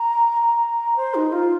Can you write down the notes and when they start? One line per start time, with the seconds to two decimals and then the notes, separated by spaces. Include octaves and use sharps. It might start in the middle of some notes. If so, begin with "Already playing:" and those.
Already playing: A#5
0.42 A#5
0.96 C5
1.15 D#4
1.32 F4